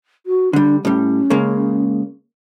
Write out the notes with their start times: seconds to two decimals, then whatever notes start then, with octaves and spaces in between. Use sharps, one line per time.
0.26 F#4
0.53 D3 G3 D4
0.85 A2 G3 C#4
1.30 C#3 G#3 A#3